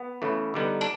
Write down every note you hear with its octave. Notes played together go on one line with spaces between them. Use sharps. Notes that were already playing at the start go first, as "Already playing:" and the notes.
Already playing: B3
C#3 E3 A3
D3 G3 B3 D#4
D4